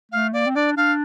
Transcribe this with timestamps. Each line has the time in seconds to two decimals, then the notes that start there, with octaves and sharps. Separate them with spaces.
0.12 A3 F5
0.33 A#3 D5
0.47 C4
0.55 D4 D5
0.76 D4 F5